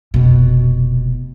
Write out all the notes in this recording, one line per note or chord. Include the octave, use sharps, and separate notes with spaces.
F1 B2